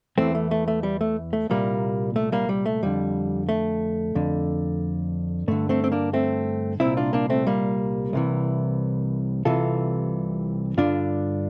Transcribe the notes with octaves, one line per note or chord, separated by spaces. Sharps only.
E2 E3 A3 C4
A3
A3
A3
G3
A3
A3
C2 A#2 G3 A#3
A3
G3 A#3
G3
A3
F2 D3 G3
A3
F2 D3
G2 D3 A3
A3 C4
C4
A#3 D4
A3 C4
C2 A#2 C4 E4
D4 F4
A#3 D4
A3 C4
G3 A#3
C2 C3 E3
C2 C3 E3 F4 A4
G2 D3 D4 F4